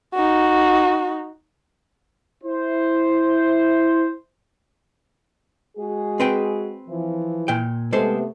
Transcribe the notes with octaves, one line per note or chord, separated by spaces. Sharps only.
D#4 F#4
E4 C5
G#3 F#4 G#4
C4 B4 G5
E3 F3
A#2 G5
C3 G#3 A3 B3 A4 C5